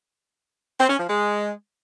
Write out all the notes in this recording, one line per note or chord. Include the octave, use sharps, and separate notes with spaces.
C4
C#4
F3
G#3